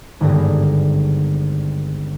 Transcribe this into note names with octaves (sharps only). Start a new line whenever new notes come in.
G#1 G2 D3 B3 G#4 A#6